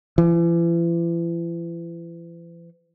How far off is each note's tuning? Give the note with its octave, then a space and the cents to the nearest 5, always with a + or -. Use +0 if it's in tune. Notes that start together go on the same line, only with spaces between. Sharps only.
E3 +40